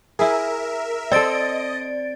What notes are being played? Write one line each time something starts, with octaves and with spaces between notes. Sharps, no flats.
E4 G#4 A#4 E5
C4 A4 D5 D#5 A6 D7